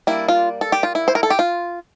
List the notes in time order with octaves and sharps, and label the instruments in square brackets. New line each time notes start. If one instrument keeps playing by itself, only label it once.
[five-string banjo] G3 A#3 D4 E4
F4
A4
G4
F4
E4
C5
A#4
A4
G4
F4